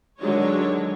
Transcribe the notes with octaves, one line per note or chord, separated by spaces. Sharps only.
D3 D#3 F#3 G#3 D4 C#5